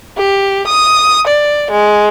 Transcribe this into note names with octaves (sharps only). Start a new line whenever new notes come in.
G4
D#6
D5
G#3